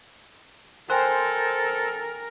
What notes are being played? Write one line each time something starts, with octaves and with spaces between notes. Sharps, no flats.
A4 A#4 C5 G5 G#5 F#6